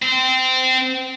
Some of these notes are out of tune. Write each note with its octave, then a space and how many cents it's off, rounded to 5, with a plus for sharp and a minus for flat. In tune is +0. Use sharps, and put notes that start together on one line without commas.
C4 -20